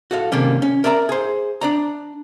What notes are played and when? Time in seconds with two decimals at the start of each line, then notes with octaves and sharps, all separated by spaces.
0.11 F#4 A4 F5
0.32 C3 D#3 A#3 C#4
0.62 C#4
0.84 A#4 D5 E5 A5 A#5
1.09 G#4 C5
1.61 D4 D5 A#5